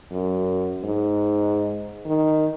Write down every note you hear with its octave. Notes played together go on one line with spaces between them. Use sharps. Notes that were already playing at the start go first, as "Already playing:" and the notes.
F#2
G#2
D#3